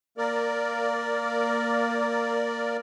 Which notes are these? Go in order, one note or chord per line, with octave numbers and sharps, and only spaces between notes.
A#3 A#4 D5